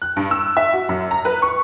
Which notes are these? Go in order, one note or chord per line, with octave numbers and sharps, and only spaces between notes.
F#6
G2
E6
E5
F#4
F#2
A#5
B4
C#6